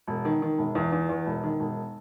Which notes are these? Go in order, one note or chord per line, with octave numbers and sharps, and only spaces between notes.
E1
D#3
D#3
E1
E2
E2
E2
E1
D#3
E1